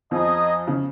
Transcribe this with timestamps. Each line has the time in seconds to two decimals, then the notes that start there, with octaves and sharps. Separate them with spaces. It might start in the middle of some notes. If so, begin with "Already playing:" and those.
0.11 F2 F3 D#4 G#4 D#5
0.68 C#3